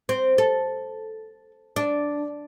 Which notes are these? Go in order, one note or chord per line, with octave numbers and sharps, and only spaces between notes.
C4
A4
D4